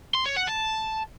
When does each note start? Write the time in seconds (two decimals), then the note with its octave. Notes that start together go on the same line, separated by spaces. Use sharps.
0.15 C6
0.26 C#5
0.36 F#5
0.47 A5